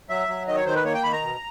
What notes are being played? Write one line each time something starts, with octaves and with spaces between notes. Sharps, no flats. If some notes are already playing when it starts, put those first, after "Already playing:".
F#3 E5
F#3
D#3 D#5
C#5
D#3 C5
B4
A#3 C#5
G5
D#3 B5
A#5
B2